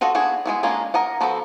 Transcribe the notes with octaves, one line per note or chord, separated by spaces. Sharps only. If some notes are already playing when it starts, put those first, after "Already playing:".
F4 F#4 A4 D#5 F#5
B3 D4 F#4 G#4
G#3 B3 E4
G#3 A#3 C#4 D4 F4
A#4 D#5 F#5
F3 B3 F#4 A4